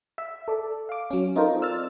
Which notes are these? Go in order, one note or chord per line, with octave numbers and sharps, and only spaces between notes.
E5
A4 D5
F5 D6
F#3 C#4
C4 D#4 F4 A4 A#4 C5
D5 E6 F6 A6